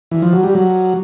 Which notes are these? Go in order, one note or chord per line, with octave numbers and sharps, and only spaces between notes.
E3
F3
F#3
G3
F#3